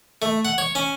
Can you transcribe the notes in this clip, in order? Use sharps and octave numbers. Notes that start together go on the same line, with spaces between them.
A3
F#5
C#5
C#4